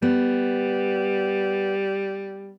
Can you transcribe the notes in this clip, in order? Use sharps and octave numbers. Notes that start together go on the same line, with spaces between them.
G3 B3